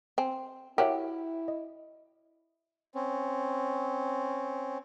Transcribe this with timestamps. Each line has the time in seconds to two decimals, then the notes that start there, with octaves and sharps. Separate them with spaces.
0.18 C4 G#5
0.78 E4 F#4 G4 A#4 C#5 E5
1.48 D#5
2.95 C4 C#4